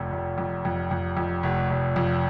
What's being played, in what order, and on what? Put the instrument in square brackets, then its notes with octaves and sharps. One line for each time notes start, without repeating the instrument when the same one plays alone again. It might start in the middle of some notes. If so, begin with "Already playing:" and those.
Already playing: [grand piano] F1 F2
F1
F2
F2
F2
F2
F1
F1
F2